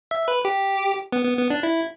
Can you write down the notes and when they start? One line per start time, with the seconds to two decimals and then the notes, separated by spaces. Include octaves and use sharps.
0.11 E5
0.28 B4
0.45 G4
1.12 B3
1.25 B3
1.38 B3
1.50 D4
1.63 E4